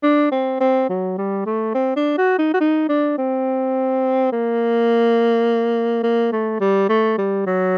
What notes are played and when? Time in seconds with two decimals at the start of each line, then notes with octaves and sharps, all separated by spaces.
0.03 D4
0.31 C4
0.61 C4
0.89 F#3
1.18 G3
1.46 A3
1.75 C4
1.96 D4
2.18 F#4
2.39 D#4
2.54 F#4
2.61 D#4
2.89 D4
3.18 C4
4.32 A#3
6.03 A#3
6.32 A3
6.60 G3
6.89 A3
7.18 G3
7.46 F#3